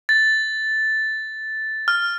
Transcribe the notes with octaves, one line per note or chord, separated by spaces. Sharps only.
A6
F6